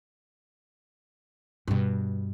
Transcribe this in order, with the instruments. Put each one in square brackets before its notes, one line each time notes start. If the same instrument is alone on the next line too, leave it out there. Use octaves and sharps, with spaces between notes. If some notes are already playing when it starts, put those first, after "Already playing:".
[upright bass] G2 B2